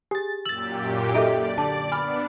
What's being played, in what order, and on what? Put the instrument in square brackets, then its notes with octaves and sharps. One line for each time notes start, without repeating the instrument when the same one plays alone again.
[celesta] G4 [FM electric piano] G#4 A6
[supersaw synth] F#2 A#2 G4 [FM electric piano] E6 A6 [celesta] F#7
[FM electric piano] D#4 G4 [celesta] A4 E5 D7 [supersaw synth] D5
[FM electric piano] D3 [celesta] A5
[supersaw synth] B3 D4 [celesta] G#5 B5 F6